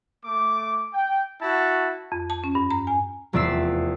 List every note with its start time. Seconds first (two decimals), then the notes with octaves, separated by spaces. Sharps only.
0.25 A3 D6
0.93 G5
1.41 E4 F#4 A5
2.12 F2
2.30 A5
2.44 C#4
2.55 G2
2.71 A#5
2.87 G#5
3.33 F1 E2 D5 E5 E6 C7